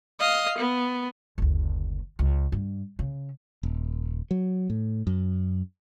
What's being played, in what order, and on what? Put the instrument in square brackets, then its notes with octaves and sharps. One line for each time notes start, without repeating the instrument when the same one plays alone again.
[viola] D#5 F5
B3
[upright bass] F#1 D2
C#2
G2
C#3
[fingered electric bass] D#1
F#3
A2
F#2